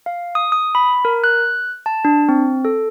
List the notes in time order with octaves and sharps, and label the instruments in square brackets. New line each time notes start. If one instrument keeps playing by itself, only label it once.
[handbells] F5
D#6
D#6
B5
A#4
F#6
A5
D4
C4
A4